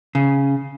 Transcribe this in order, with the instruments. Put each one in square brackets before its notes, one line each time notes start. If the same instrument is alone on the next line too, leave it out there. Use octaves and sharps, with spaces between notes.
[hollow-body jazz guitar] C#3